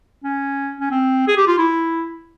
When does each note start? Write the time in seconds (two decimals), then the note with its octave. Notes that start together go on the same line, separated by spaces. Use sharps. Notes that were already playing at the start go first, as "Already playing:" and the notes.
0.24 C#4
0.80 C#4
0.91 C4
1.28 G#4
1.37 G4
1.47 F4
1.58 E4